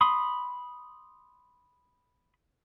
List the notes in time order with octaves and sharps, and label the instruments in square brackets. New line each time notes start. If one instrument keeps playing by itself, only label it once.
[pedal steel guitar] B5 C6 D#6